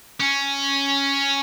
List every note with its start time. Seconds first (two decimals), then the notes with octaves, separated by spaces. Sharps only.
0.20 C#4